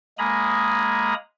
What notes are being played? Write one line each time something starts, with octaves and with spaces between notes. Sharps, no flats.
G#3 A#3 G#5 A#5 B5 D#6